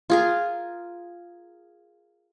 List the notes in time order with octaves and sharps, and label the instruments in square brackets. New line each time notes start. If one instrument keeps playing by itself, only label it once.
[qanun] F4 G#4 A#4